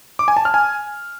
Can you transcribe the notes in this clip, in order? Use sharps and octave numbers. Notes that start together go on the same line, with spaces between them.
D6
G#5
A5
F6
G#5